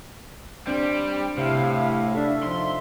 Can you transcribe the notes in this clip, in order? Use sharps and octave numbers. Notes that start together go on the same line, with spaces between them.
G3 C4 D4 G4 C5
A2 C3 E4 G4 C5 F5
D4 A4 E5
F3 D#4 E5 C6